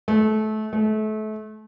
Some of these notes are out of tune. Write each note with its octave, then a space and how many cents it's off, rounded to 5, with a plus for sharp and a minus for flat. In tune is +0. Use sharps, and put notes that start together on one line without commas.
A3 -25
A3 -30